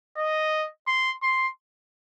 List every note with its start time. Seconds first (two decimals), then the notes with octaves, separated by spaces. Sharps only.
0.17 D#5
0.87 C6
1.22 C6